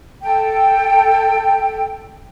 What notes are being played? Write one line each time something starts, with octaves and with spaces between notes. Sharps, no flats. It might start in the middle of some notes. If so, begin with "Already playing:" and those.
A4 G5